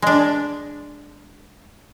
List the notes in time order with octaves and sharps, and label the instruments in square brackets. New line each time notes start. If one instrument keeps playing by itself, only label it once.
[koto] G#3 D4